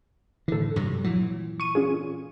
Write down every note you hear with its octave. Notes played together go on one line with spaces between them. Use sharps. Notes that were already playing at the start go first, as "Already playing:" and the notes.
A2 D3 E3 A4
G2 C3 F#3
A#2 E3 F#3
C#6 D#7
C#4 F4 G#4